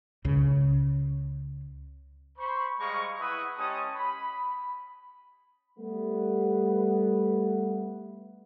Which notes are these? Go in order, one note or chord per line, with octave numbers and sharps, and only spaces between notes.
C#2 C#3
C5 B5 C#6
G3 G#3 F5 A#5 C#6
E4 B4 E5 F#5 C#6 D#6
G#3 C#4 G4 A5 D#6
B5
G3 A3 B3